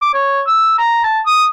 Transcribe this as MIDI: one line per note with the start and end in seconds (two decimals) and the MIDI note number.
0.02 0.11 86
0.14 0.42 73
0.47 0.75 88
0.79 1.02 82
1.04 1.21 81
1.26 1.45 87